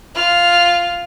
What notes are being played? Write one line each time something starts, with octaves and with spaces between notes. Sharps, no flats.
F4 F6